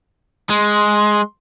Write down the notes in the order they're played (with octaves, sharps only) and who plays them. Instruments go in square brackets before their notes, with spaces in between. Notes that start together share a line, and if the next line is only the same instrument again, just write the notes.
[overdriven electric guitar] G#3 [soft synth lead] C6